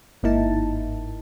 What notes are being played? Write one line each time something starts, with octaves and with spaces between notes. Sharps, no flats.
G1 G#2 A#3 D#4 E4 A5